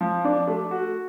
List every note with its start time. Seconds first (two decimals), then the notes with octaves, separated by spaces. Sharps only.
0.01 F3
0.25 D4
0.48 A3
0.71 F#4